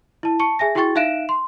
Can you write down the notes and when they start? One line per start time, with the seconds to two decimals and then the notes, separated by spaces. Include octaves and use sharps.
0.23 E4 A5
0.40 A5 C#6 C#7
0.59 G#4 E5 G#5 A#6
0.75 E4 F#4 G#4 G5 C#6 A6
0.95 D#4 E5 F5 F#6 D7 E7
1.29 C6